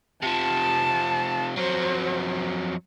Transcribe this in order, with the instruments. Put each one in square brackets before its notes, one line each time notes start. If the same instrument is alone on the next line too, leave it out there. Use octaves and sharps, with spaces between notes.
[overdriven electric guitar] C3 F3 [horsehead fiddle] A5
[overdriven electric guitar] F2 F#3 [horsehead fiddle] C5